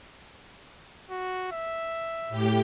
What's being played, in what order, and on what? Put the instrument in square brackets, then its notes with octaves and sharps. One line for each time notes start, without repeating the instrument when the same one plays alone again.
[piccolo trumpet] F#4
E5
[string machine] A2 G4 G5